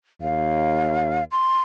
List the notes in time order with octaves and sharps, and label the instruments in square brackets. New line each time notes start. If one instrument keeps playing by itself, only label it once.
[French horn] D#2 [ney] F5
[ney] C6